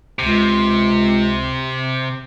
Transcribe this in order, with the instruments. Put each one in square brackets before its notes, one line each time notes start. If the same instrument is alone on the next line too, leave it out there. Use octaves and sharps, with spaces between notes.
[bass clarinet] C#2 [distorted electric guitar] C3